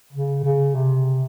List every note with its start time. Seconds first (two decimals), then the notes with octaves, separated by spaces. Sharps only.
0.13 C#3
0.44 C#3
0.75 C3